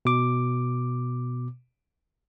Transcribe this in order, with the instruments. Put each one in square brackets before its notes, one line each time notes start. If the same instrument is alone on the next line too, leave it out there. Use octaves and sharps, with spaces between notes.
[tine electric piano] B2 D6